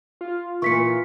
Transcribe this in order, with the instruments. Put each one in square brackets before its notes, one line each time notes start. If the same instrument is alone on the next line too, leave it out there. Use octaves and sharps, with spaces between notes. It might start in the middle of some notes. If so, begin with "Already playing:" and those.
[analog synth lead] F4
[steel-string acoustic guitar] A#2 E3 [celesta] C#6 B6 C#7